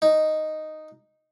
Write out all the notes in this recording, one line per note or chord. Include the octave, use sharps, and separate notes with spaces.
D#4